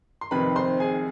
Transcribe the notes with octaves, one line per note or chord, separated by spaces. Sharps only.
C6
F1 F2 C3 D#3 B4 B5
C5 C6
G#4 G#5